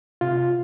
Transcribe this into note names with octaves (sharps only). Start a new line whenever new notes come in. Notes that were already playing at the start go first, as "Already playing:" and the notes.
C3 F4